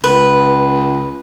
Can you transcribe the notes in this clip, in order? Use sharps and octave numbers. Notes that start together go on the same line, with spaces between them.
C#2 B4